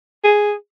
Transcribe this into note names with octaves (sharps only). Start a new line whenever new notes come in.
G#4